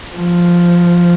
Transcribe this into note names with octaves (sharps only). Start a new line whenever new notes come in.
F3